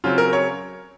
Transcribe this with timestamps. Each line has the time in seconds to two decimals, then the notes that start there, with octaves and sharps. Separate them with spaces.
0.04 C#3 F#3 C4 F4
0.18 A#4
0.33 C#5